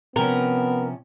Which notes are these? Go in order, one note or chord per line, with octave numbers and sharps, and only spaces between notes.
C3 F3 B3 C#4 A#4